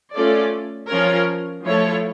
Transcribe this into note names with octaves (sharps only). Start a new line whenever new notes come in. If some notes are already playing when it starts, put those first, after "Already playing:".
A3 C#4 F4 A4 D5
F3 C#4 F4 A#4 C#5
F3 A3 E4 A4 C#5